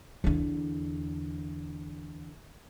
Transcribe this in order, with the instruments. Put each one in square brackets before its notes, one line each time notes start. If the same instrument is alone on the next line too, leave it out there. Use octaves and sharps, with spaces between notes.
[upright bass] E2 D3